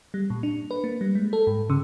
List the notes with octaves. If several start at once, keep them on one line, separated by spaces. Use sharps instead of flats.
G3
A#2
D4
B4
A#3
G3
G#3
A4
G#2
C#3